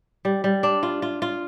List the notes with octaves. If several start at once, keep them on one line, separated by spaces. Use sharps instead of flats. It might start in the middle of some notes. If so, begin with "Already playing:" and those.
G3
G3
D4
F4
F4
F4